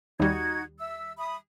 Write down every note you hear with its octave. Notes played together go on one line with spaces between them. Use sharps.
D#2 G3 D#4 F#4 G#6
E5 E6
E5 B5 D#6